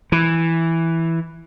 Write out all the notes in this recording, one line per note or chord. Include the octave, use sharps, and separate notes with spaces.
E3